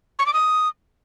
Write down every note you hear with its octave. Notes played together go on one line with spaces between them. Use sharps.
C#6
D6
D#6